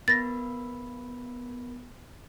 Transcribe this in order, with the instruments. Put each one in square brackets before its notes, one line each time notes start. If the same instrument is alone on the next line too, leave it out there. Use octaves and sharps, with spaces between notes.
[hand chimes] B3 A#4 B5 [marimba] A6 A#6